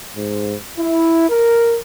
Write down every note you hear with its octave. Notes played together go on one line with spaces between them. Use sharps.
G#2
E4
A#4